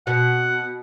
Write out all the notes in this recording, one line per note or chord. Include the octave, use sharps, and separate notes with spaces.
B2 F#5